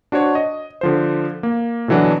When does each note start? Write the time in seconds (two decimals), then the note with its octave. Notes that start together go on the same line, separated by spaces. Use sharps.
0.12 D4 F#4 C5 C#5
0.35 D#5
0.81 D3 F3 C5
1.43 A#3
1.88 B2 D3 E3 F#3 D4